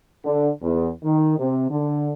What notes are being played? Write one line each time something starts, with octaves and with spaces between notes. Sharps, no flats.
D3
E2
D#3
C3
D3